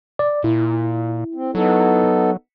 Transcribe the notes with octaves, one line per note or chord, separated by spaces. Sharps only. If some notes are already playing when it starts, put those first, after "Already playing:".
D5
A#2 E4
C4
F#3 B3 D#4 A4